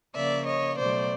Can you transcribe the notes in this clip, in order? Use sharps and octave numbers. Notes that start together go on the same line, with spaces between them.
C#3 F3 A#3 D5 E5
C#5 D#5
B2 F#3 A3 C5 D5